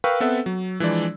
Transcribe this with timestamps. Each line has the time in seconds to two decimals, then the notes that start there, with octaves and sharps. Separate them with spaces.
0.04 A#4 B4 F5 G5 C#6 E6
0.20 B3 C4 A4 B4 E5 F#5
0.46 F#3
0.80 E3 F3 G#3 D4 D5